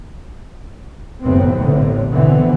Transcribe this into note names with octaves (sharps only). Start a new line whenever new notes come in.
F#1 D#2 A2 C3 B3 C4
A1 A2 D3
B2 D3 E3 B3 C4